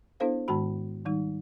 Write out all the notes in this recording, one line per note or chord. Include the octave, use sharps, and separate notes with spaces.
B3 D4 E4 A4 C5 F5
G#2 D#3 G#3 F#4 B5
D#3 G3 D#4